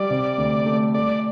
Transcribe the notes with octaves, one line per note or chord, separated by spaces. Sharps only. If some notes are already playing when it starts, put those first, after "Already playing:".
Already playing: G3 D5
C3
D2
A3
A3 D5